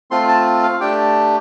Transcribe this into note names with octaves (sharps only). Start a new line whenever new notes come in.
A3 C4 F4 C6
A5
F5
A3 D4 G4 G5